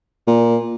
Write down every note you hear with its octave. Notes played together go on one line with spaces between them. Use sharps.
A#2